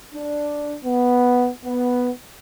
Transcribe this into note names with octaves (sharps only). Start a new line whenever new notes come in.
D4
B3
B3